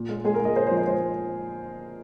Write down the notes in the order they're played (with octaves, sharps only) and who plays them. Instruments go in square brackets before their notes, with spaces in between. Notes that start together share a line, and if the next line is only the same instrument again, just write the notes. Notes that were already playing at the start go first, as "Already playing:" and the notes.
Already playing: [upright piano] A#2
G#3
G#3 G#4
A#4
G#3 D#5
G#3 C5
C5
F3
D#5
G#3 C5